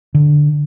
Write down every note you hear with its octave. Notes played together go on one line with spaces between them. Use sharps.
D3